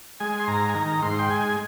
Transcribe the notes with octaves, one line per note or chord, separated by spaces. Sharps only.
G#3 G#5
C6
G#2 A#5
G#5
D#3 A#5
G#2 C6
G5
G#3 G#5